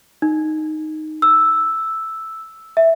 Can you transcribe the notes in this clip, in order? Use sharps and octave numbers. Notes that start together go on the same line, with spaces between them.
D#4
E6
E5